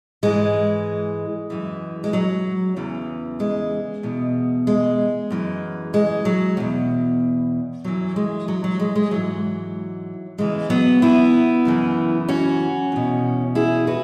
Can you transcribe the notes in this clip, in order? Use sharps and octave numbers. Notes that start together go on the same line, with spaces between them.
G#2 E3 G#3
F#2 E3
G#3
F#3
E2 C#3 E3
G#3
E2 B2
G#3
F#2 E3
G#3
F#3
E2 B2
F#2 E3 F#3
G#3
F#3
F#3
G#3
G#3
G#2 E3 F#3
E2 C#3 E3 G#3
F#3 B3
B3 E4
F#2 C#3 E3
C#4 F#4
E2 B2
E4 G#4
F#4 B4